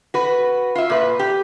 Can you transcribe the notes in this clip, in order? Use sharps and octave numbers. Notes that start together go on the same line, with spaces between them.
F#4 B4
F4 E5
A#2 B4
G4